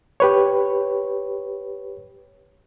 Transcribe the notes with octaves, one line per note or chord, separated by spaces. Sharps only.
G4 B4 C#5